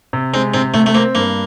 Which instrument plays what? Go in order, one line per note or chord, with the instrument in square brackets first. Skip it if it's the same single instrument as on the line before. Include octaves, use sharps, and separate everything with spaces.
[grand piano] C3
[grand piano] G#3 [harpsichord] C4
[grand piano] C3 [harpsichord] C4
[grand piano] C3 [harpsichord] A3
[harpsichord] A3
[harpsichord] A#3 [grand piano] C4
[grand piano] G2 [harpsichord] A#3